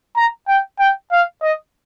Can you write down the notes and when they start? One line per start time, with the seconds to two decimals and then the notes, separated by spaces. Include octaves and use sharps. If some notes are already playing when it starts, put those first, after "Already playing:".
0.16 A#5
0.48 G5
0.79 G5
1.11 F5
1.42 D#5